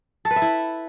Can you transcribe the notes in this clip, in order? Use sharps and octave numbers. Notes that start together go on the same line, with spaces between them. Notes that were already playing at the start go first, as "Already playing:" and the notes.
A4
B4
E5
E4